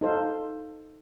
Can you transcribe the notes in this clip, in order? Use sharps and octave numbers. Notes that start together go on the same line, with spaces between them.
D#4 A4 C5 F5